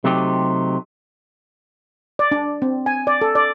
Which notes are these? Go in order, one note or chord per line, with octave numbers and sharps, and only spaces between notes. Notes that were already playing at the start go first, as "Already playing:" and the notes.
C3 F#3 A3 C4 D#4 G4
D5
D4
C4
G#5
D5
A4
D5